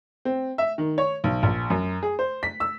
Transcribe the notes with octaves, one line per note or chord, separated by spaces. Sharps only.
C4
E5
D#3
C#5
B1
A#1
F#2
G#4
C5
B6
E6